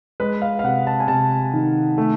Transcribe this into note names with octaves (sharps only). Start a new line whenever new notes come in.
G#3 B4
F5
F5
C3 F#5
A5
G#5
C3 A5
D#3
A3